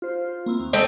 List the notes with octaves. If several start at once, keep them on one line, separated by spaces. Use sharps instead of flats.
F4 C5
A#3 C4 E4
D#2
G#3 A3 C4 D#5